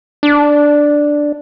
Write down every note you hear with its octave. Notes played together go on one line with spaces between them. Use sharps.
D4